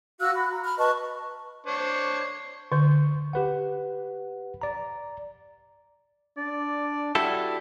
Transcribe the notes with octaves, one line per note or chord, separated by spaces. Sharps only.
F#4 F5 E6 F#6
F#4 B5
A#5
B5 F6
B4 D#5 A5 C#6
D4 C5 C#5
D3 C#6 G6
G4 B4 F#5
D5 A#5
D4 D5
G3 E4 F#4 A4